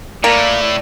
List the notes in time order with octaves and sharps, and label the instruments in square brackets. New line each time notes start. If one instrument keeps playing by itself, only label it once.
[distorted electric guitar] A2 [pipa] A#3 [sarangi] D5